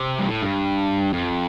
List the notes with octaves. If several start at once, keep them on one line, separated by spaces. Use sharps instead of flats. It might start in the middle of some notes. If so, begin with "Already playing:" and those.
Already playing: C3
G2
A2
G2
F2